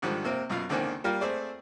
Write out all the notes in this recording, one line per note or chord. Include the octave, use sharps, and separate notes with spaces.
G#2 D3 D#3 F3 G3
C3 A#3 C4
F#2 B2 F4 F5
C#2 D3 D#3 A#3 C4 G#5
G3 A#3 F4 A#4 G5
A3 C4 G#4 C5 D5